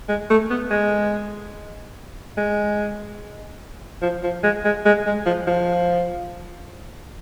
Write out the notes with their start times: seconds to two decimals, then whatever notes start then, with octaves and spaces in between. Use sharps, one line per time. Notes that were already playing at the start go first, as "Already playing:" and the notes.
0.09 G#3
0.30 A3
0.50 B3
0.71 G#3
2.37 G#3
4.02 F3
4.23 F3
4.43 G#3
4.65 G#3
4.85 G#3
5.06 G#3
5.26 F3
5.47 F3